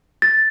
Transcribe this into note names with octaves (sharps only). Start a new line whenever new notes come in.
A6